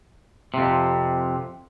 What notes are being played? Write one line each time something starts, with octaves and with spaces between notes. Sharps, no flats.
F2 C3